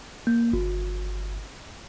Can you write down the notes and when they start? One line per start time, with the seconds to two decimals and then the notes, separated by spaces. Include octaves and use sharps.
0.27 A#3
0.53 G1